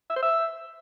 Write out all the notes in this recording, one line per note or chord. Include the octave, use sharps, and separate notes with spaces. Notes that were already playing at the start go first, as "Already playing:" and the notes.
E5
C5
E5